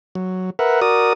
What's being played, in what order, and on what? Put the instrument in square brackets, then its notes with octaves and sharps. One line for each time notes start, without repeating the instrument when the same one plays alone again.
[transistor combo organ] F#3
A#4 B4 E5 F#5
F#4 A#4 D5 D#6